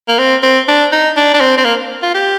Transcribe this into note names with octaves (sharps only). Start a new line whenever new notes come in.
A#3
C4
C4
D4
D#4
D4
D4
C4
C4
A#3
F4
G4